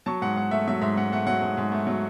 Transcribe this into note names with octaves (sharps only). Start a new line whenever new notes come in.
F#3 A5 C#6
G#2 F#5
G#2 F#5
A3 E5
F#3 E5
G#2 E5
G#2 F#5
A3 F#5
F#3 F#5
G#2
G#2
A3
F#3